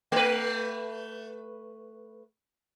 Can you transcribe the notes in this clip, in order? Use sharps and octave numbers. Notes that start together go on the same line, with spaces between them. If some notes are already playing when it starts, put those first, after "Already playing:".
A3 B4